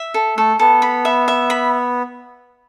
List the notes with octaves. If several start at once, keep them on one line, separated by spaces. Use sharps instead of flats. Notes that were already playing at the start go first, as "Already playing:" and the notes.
Already playing: E5
A4
A3 A4
B3 A4
B5
E5
E5
B5